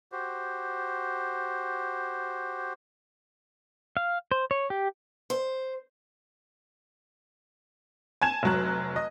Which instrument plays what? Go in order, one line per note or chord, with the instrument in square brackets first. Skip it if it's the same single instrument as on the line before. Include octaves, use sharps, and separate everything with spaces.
[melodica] F#4 G4 C5
[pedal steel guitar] F5
C5
C#5
G4
[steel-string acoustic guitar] C5
[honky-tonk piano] G#5 A5 G#6 E7
F1 F#3 F#6
D#5